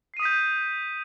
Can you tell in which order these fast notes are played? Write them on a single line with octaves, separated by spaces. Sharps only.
C7 D#7 D#6 B6 G6